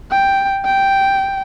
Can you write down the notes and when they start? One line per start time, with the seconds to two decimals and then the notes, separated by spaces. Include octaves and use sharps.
0.11 G5
0.65 G5